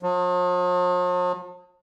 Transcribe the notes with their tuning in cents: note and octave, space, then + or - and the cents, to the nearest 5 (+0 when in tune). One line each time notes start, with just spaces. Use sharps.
F3 +45